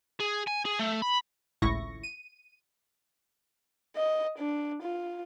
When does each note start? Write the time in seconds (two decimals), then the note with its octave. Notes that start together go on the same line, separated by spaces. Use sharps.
0.20 G#4
0.47 G#5
0.65 G#4
0.79 A3
1.02 B5
1.62 G#1 C#2 A2 E4 C#6 A#6
2.03 D#7
3.96 D#5
4.39 D4
4.83 F4